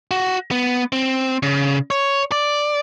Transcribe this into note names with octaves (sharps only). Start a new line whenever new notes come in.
F#4
B3
C4
C#3
C#5
D5